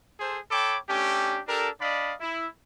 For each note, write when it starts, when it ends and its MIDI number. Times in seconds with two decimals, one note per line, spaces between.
0.20 0.39 68
0.20 0.39 69
0.20 0.39 72
0.51 0.78 69
0.51 0.78 73
0.51 0.78 79
0.51 0.78 83
0.51 0.78 86
0.90 1.41 57
0.90 1.41 61
0.90 1.41 62
0.90 1.41 67
1.48 1.69 62
1.48 1.69 67
1.48 1.69 69
1.48 1.69 70
1.81 2.15 62
1.81 2.15 74
1.81 2.15 75
1.81 2.15 77
1.81 2.15 83
2.20 2.48 64